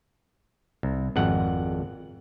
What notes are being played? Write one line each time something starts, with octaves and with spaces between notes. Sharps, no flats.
C2
G#1 F2 F#5